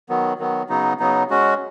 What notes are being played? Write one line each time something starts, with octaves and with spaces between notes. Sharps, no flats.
D#3 F#3 B3
D#3 F#3 B3
C#3 F#3 B3 D#4
C#3 F#3 B3 D#4
G#3 C#4 F#4